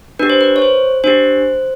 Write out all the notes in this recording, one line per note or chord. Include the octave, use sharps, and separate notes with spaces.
D4 G4 B4
C5
B4
C#5
C5
D4 G4 C5